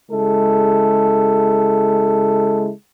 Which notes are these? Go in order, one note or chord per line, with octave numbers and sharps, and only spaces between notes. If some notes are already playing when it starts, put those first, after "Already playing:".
C#3 G#3 E4 A4